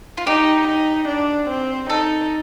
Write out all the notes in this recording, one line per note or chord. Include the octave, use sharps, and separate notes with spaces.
F4
D#4 G4
D#4
D4
C4
D#4 A4